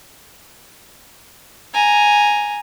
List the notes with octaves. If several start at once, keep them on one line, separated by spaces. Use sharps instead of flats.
G#5 A#5